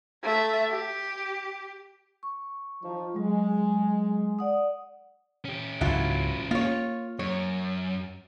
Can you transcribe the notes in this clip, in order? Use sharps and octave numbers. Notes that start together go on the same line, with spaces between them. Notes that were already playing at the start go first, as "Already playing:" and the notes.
A3 E5
G4
C#6
F3 D#4
F#3 G#3
D5 F#5 D#6
C#4 G4
C#2 G#2 F#3 E4 F4
A#3 F4 C#5
F#2 C#5